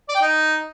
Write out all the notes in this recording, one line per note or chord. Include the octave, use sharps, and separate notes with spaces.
D5
G5
D#4